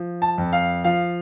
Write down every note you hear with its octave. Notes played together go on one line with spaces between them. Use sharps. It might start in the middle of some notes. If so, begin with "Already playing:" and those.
Already playing: F3
A5
F2
F5
F3 F5